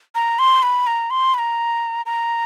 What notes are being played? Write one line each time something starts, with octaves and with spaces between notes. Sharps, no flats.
A#5
C6
B5
A#5
C6
B5
A#5
A#5